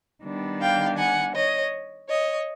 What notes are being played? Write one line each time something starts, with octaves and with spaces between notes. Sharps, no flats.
D#3 G3 B3 D4
F5 G5
F#5 G#5
C#5 D#5
C#5 D#5